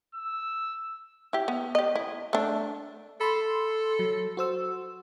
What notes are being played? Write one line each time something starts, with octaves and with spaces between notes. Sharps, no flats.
E6
E4 G4
B3
G4 D#5
E4
A3 D4
A4 B5 C6
F#3
F#4 C5 E6